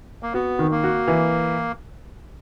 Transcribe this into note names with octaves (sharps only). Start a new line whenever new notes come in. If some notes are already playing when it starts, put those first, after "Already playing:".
A#3
B3 F#4
D#3
A#3
F#4
E3